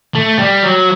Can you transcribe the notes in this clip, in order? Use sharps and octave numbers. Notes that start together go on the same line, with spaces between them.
A3
G3
F#3